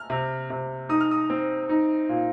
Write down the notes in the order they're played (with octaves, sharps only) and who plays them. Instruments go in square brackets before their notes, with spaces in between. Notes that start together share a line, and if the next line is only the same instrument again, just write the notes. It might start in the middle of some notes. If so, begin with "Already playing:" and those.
Already playing: [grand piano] F6
C3
C3
D#4 D#6
F6
D#6
C4
D#4
A#2